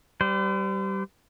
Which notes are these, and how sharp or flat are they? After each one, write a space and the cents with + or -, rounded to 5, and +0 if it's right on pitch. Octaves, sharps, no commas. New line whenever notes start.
G3 -15 C5 -45